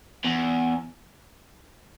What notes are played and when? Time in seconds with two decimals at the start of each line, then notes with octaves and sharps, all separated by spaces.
0.25 E2